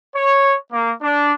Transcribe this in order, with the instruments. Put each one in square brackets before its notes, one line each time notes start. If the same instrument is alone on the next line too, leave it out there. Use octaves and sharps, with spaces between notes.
[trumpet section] C#5
A#3
D4